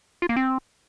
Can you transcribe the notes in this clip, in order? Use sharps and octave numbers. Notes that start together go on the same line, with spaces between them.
F4
A#3
C4